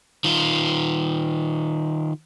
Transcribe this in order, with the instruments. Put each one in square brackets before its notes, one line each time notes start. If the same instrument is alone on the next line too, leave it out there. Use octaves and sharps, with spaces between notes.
[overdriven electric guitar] D#3 F4